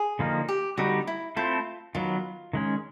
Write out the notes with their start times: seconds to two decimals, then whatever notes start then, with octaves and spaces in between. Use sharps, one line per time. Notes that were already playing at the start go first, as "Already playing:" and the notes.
Already playing: G#4
0.19 D3 F3 A#3 D#4
0.48 G4
0.77 D3 G3 B3 D#4 F#4 G4
1.07 E4
1.36 A3 C4 E4 F4 A4 C5
1.95 D#3 F#3 B3 F4
2.53 D#3 G#3 C#4